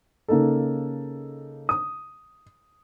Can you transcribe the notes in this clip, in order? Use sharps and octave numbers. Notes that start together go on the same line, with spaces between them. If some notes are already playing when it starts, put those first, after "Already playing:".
C#3 A#3 D#4 A4
D#6